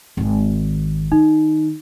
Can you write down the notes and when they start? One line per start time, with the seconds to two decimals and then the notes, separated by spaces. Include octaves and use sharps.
0.17 G#1 D#3
1.12 D#3 D#4